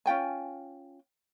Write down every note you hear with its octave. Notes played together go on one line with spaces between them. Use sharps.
C#4 F4 G5 G#5